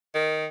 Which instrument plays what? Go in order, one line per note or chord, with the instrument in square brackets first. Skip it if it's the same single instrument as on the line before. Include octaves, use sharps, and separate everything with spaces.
[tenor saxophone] D#3